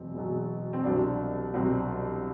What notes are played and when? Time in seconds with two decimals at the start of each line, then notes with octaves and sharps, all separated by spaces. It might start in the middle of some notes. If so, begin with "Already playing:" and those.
Already playing: E1 E2 B2 F#3 C4
0.14 E1 E2 B2 F#3
0.73 C4
0.84 C2 B2 F#3 D4
1.54 C2 B2 F#3 C4